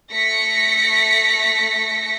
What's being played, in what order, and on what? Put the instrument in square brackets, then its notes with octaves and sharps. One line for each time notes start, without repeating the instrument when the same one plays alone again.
[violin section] A3 A#6 B6 C#7